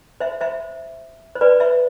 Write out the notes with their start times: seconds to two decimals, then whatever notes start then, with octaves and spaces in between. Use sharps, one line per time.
0.20 C5 E5
0.41 C5 E5
1.35 C5
1.41 B4 D5
1.60 C5 E5